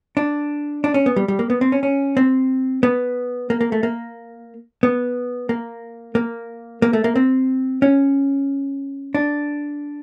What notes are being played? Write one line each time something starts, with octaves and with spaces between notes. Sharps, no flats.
D4
D4
C#4
B3
G3
G3
A#3
B3
C4
C#4
C#4
C4
B3
A#3
A#3
A3
A#3
B3
A#3
A#3
A#3
A3
A#3
C4
C#4
D4